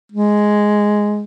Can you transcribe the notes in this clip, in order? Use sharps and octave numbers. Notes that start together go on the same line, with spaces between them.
G#3